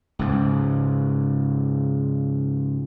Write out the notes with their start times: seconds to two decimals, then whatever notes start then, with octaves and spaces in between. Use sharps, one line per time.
0.19 C#2 G#2